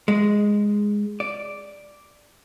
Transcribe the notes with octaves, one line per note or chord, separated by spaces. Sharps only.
G#3
D5